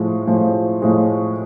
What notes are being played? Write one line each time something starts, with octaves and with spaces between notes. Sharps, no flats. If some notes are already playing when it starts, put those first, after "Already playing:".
Already playing: A2 F3 G#3
A2 F3 G#3
A2 F3 G#3